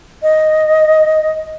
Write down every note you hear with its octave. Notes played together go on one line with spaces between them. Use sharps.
D#5